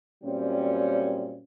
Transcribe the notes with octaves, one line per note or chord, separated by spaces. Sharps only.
F#2 A#2 G3 C4 C#4